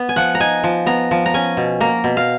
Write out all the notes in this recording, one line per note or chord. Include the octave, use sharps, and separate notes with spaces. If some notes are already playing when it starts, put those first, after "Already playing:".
Already playing: B3
G#5
F3 F#5
A#5
D#4 G#5
F3
B3 A#5
F3
A#5
C#4 G#5
B2
A#3 A#5
B2
F5